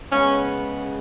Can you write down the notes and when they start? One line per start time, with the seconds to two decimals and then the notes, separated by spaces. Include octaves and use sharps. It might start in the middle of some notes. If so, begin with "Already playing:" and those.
0.11 C#3 G#3 B3 C#4